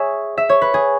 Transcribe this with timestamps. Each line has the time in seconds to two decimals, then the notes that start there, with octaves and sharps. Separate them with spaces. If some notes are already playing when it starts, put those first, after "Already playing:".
Already playing: G#4 C#5 E5
0.37 E5
0.49 C#5
0.61 B4
0.74 G#4